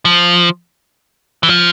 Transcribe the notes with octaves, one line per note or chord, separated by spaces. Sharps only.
F3
E3
F3